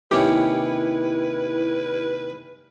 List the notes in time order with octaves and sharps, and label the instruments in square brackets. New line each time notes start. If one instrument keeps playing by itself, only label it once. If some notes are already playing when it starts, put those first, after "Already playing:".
[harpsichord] D#2 C3 C#4 [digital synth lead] E4 [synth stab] G4 [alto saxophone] B4